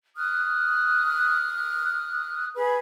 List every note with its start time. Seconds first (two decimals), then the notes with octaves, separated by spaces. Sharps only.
0.17 D#6 F6 F#6
2.55 G#4 B4 B5